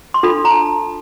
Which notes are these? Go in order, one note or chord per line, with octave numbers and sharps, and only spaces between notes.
C6
D4 F4 A4 B5
A#5
A5